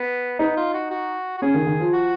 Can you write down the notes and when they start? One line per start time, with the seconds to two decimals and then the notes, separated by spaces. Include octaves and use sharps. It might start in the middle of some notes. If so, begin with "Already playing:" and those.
Already playing: B3
0.39 B3 D#4
0.57 F4
0.74 F#4
0.91 F#4
1.38 F#4
1.42 C#4 G#4
1.54 D#3
1.67 D#3
1.80 F3
1.93 F#4